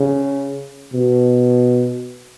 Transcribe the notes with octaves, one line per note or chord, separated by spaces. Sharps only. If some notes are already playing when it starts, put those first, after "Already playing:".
Already playing: C#3
B2